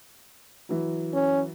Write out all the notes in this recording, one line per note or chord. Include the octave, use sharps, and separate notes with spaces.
E3 F#3
C#4